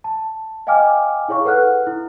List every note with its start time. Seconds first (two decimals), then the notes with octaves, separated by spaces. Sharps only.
0.04 A5
0.67 D#5 F5 G5 G#5 D6 F6
1.29 E4 G#4 C#5 F5 C#6
1.45 A4 B4 F#5 F6 F#6
1.87 E4